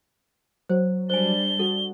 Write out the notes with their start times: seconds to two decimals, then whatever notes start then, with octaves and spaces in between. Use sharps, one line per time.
0.69 F#3 C5
1.10 G3 D4 C5 G#5 G7
1.59 F#4 A4